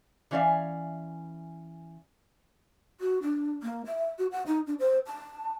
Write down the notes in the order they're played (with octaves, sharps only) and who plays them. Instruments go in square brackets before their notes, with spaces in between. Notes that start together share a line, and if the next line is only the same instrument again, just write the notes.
[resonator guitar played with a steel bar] E3 C#4 D5 E5 F5
[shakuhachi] F#4
D4
A#3
E5
F#4
F#5
D#4
D4
C5
A5